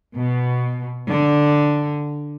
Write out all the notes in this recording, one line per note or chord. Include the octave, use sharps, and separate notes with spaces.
B2
D3